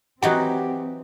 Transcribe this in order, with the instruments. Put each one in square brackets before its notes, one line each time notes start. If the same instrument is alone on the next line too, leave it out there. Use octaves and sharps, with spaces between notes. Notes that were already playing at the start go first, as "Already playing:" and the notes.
[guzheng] E3 F#3 D#4 [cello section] C4 [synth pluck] F#4 D#5 F#5 [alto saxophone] G4